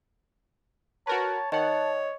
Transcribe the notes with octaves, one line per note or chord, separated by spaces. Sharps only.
F#4 A#4 B4 C#5 A5
D#3 C#5 D#5 F#5 A5